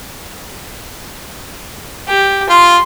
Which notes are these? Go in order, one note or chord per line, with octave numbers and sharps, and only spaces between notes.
G4
F4 C6